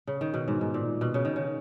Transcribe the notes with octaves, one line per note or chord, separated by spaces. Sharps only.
C#3
D#3
B2
G#2
G#2
A#2
B2
C#3
D#3
C#3